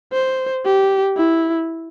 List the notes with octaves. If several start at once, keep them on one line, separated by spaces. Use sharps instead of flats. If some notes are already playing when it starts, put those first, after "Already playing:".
C5
G4
E4